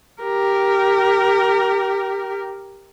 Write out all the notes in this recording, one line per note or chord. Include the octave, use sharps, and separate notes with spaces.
G4 A#4